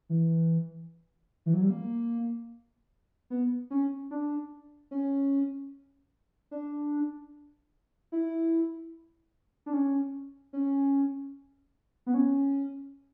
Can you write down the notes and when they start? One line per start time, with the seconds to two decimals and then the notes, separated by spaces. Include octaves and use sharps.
0.09 E3
1.46 E3
1.53 F#3
1.62 G3
1.70 A#3
3.30 B3
3.71 C#4
4.11 D4
4.91 C#4
6.51 D4
8.12 E4
9.66 D4
9.73 C#4
10.53 C#4
12.06 B3
12.14 C#4